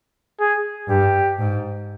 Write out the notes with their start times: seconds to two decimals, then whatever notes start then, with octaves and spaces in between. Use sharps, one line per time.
0.40 G#4
0.88 G2 G4
1.39 G#2